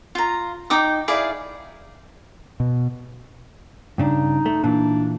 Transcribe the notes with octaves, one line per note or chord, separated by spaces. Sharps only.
F4 A#5
D#4 G5 D6 D#6
E4 G#4 D5 F5
B2
G2 C#3 D4 D#4
A3
A#2 E3 D4